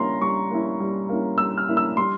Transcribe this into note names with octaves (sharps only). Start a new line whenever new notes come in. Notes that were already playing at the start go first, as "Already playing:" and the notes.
Already playing: G3 A#3 C#4 E4 A#5 C6
G3 C#6
A#3 C#4 E4
G3
A#3 C#4 E4
G3 E6
F6
A#3 C#4 E4
E6
G3 C6